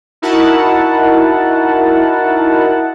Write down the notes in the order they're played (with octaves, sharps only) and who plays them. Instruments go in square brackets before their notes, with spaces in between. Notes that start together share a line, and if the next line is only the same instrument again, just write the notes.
[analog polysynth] D#4 E4 F#4 A#4 F#5 A5